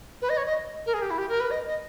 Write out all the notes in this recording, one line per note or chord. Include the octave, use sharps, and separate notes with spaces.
B4
D#5
C#5
D#5
A#4
G#4
G4
E4
G4
A#4
B4
D#5
D#5